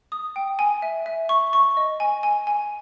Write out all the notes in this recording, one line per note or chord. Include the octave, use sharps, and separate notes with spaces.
D#6
G5
G#5
E5
E5
C#6
C#6
D#5
G#5
G#5
G#5